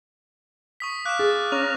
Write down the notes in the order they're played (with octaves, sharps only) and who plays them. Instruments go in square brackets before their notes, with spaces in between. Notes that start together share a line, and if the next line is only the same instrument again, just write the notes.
[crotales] C#6 D#6 B6
[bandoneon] F5 D6 [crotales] F#6 E7
[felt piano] G#4 [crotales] A6
[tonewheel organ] C#4 A#5 F6 [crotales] C#6